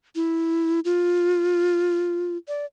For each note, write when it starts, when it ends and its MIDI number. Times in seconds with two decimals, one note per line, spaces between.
0.15 0.80 64
0.85 2.37 65
2.48 2.66 74